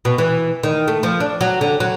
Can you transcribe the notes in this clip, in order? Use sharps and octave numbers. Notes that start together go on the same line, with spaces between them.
B2
E3
D#3
A3
F3
D4
F#3
D3
F#3